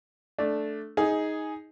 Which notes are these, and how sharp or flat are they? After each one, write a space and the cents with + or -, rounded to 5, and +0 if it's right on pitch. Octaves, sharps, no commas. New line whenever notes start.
A3 -5 D4 +0
D#4 +15 G#4 +0